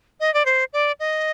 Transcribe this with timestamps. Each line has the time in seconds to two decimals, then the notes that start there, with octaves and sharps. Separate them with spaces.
0.20 D#5
0.34 D5
0.45 C5
0.73 D5
1.00 D#5